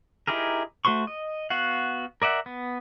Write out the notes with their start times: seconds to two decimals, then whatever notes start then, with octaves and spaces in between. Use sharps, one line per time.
0.27 D#4 E4 G4 G#4 A#4
0.85 A3 F#4 C5 C6 C#6
1.07 D#5
1.50 B3 F#4 F5 F#5
2.22 A#4 D5 E5 F#5
2.46 B3